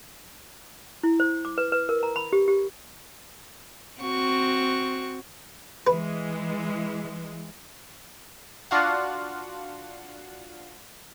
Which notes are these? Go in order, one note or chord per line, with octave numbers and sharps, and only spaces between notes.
E4
C5
D6
B4
B4
A#4
A#5
B5
G4
G4
C4 F#4 C#6
E3 G#3 B4
D4 F4 F#4 F5 F#5